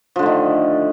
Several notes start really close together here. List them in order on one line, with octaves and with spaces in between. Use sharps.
F3 D3 A3 D#3